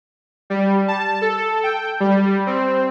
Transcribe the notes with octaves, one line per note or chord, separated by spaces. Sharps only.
G3
A5
A4
G5
G3
C4